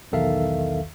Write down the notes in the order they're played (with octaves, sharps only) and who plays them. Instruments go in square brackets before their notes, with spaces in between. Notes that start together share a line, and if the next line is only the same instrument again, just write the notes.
[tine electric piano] B1 E2 D#3 A4 E5 F5